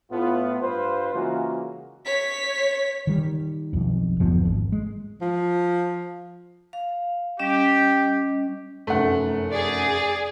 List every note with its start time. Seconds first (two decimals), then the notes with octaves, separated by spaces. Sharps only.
0.11 A2 B3 F4
0.60 G2 F4 B4 C5
1.13 C#3 E3 G#3 A#3 F4 F#4
2.06 C#5 B6
3.07 D#3 G3
3.73 B1 F2
4.20 G1 E2 F3 B3
4.45 G#1
4.72 G#3
5.21 F3
6.73 F5
7.39 G3 C#4 G4 D#5
8.87 F1 F#2 A3 F#5
9.52 G#4 D5